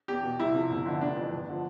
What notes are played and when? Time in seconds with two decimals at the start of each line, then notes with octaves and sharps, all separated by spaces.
0.08 E2 G4
0.23 B2
0.39 C2 E4
0.55 C3 F3
0.70 G1
0.86 F2 D3
1.01 F1 D4
1.16 F2 E3
1.32 G1
1.49 D3 F3